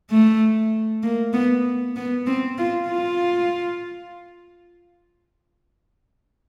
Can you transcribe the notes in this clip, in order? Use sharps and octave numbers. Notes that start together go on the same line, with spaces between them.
A3
A#3
B3
B3
C4
F4
F4